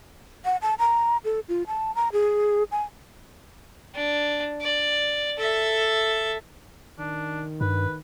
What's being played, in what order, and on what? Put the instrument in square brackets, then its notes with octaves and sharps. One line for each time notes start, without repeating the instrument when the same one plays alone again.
[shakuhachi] F#5
A5
A#5
A4
F4
A5
A#5
G#4
G#5
[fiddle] D4
D5
A4 E5
[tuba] D#3 [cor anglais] D4
[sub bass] G2 [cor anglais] B4